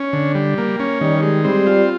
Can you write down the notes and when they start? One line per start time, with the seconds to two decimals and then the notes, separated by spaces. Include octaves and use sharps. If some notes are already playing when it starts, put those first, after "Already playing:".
Already playing: C#4
0.13 D3
0.35 G3
0.58 A#3
0.80 C#4
1.01 D#3 G3
1.23 G#3
1.44 G3 C4
1.67 F4